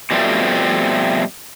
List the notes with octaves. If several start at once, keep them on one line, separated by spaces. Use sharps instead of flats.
B2 F3 G3 A3 C4